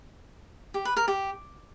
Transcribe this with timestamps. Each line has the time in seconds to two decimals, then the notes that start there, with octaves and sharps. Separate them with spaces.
0.74 G4
0.85 B4
0.97 A#4
1.08 G4